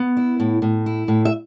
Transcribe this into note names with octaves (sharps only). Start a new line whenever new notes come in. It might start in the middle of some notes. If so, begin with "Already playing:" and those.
Already playing: B3
E4
A2
A2
E4
A2
E5